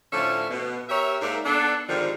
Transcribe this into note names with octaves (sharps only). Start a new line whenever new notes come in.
A2 D3 F3 A3 C#4 E5
B2
G4 A#4 C#5 E5
G#2 A#3 A#4 D5 E5
B3 D4 A4
G#2 D3 D#3 F3 G3